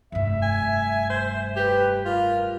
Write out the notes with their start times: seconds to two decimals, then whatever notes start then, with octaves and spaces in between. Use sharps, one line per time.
0.12 F1 G2 E5
0.42 G#5
1.10 C5
1.56 G4 B4
2.06 F4 G4 A#4